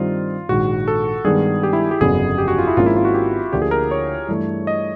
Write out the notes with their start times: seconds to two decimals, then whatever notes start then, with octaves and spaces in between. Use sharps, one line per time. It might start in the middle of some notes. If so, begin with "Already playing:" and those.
Already playing: G2 D#3 G3 C4 D#4 F4
0.49 A#1 G#2 D#3 F#4
0.88 A4
1.25 G2 D#3 G#3 B3 G#4
1.63 G4
1.73 E4
1.91 G4
2.01 G1 F2 C#3 F#3 B3 G#4
2.38 G4
2.48 F#4
2.58 F4
2.67 E4
2.77 G#1 G#2 F3 A#3 C#4 F4
2.86 E4
2.96 F4
3.05 F#4
3.14 G4
3.53 D2 D3 F3 A#3 G4
3.62 G#4
3.71 A#4
3.91 C#5
4.28 G2 E3 A3
4.67 D#5